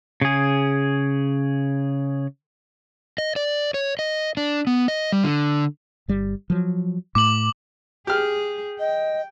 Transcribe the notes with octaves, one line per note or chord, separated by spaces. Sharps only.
C#3 G#4
D#5
D5
C#5
D#5
D4
B3
D#5
G3
D3
G1 G3
F3 F#3
A2 A3 D6 F#7
G4 G#4 F6
D#5 G5